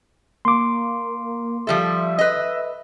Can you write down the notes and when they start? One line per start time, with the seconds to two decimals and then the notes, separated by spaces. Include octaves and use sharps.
0.45 A#3 C6 D6
1.67 F3 G3 A4 E5
2.19 B4 D#5